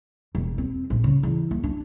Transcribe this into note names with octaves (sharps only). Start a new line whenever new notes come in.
E1
C4
A#1
C#3
E2
A#3
D4